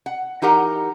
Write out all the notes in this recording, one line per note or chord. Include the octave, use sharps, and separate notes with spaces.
F#5
E3 D#4 G4 A#4 F#5